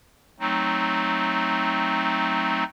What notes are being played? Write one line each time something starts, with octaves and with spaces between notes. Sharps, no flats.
F#3 A3 C4 D#4